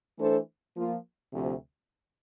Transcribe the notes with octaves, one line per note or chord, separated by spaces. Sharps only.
E3 A3 D4 A4 C5
F3 A#3 F4
D2 C3 F3